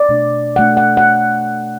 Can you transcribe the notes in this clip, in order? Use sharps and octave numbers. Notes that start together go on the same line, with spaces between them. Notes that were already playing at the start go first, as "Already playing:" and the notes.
Already playing: D5
B2 A3 D4
B2 A3 D4 F#5
F#5
F#5